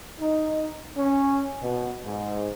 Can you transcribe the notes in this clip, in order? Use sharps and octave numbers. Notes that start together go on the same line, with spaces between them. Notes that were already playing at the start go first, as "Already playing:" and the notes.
D#4
C#4
B2
G#2